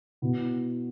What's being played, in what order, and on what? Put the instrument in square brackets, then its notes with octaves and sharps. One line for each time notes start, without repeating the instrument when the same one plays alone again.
[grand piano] B2 B3 E4